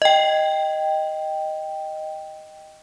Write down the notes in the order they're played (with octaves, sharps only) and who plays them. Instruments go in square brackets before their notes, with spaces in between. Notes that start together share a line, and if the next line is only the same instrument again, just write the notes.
[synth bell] D#5 G5